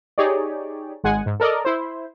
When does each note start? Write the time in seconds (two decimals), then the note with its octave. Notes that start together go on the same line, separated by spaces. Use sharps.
0.18 D#4 G4 G#4 C#5 D5
1.04 G#1 G#3 F#5 G#5
1.26 G#2
1.40 A4 A#4 D5 D#5
1.65 E4 C5